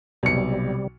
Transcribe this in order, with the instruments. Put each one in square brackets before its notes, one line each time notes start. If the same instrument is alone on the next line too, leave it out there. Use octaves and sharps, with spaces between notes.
[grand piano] B1 C#7 [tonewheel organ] C3 G3